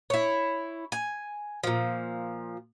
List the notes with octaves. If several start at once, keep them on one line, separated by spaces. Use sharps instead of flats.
E4 C#5
G#5
A#2 F3